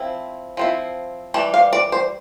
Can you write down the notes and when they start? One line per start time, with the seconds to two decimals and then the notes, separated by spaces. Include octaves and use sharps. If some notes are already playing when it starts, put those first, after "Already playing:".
Already playing: F3 C4 E4
0.57 F3 C4 E4
1.34 E3 G3 A5
1.54 F5
1.73 D5
1.92 C5